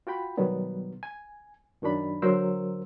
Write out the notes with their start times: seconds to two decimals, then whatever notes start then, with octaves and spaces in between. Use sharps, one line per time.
0.07 F4 F#4 G5 B5
0.38 B2 D#3 F#3 G3 B3
1.03 G#5
1.82 F#2 D#3 F#3 D4 B5
2.22 D3 F#3 A#4 C5 E6